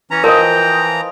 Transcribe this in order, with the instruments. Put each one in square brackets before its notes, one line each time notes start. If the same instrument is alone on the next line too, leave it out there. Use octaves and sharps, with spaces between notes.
[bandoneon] E3 A#5 [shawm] C#4
[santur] F3 D#5 [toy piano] A#4 [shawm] G5